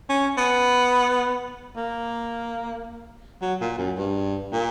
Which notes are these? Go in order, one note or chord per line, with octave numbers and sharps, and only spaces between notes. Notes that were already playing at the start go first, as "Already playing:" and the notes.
C#4
B3
A#3
F#3
A#2
F#2
G2
A#2